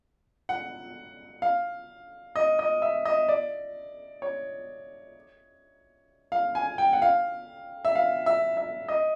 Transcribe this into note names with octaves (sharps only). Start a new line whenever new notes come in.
F#5
F5
D#5
D#5
E5
D#5
D5
C#5
F5
G#5
G5
F#5
F5
E5
F5
E5
E5
D#5